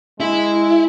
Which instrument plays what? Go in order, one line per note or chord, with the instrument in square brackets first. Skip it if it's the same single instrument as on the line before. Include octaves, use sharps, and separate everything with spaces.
[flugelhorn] G#3 [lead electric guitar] E4